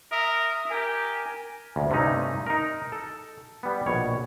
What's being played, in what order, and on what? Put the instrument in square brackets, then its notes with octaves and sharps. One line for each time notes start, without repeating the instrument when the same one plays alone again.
[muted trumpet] A#4 [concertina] E5 D#6
[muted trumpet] G4 [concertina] A#4 G#5
[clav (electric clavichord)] D2
G2 C3 A3 C#4 D#4
D#4 A#4
A4
G3 B3
A#1 B2 C#5